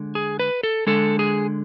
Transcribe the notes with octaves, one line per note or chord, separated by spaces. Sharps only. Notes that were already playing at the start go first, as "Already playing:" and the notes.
Already playing: D3 G#3
G#4
B4
A4
D3 G#3 A4
G#4